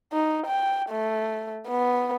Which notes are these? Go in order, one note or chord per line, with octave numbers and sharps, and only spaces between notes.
D#4
G5
A3
B3